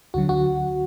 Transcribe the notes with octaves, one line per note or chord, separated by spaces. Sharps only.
D2 D3 F#3 F#4
F#4